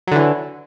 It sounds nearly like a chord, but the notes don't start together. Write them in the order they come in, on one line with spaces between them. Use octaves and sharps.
F#3 D3 E3